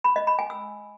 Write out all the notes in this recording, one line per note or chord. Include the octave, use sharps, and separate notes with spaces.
B5
D#5
B5
G#5
E6